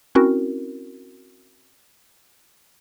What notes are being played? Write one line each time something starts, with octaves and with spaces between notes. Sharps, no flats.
C4 C#4 E4 F#4 A#4